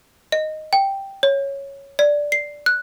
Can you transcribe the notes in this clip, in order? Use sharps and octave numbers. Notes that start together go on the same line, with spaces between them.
D#5
G5
C#5
D5
C7
F#6